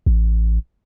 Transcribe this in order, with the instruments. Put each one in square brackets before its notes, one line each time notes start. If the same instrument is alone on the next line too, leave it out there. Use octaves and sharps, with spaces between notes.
[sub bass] A1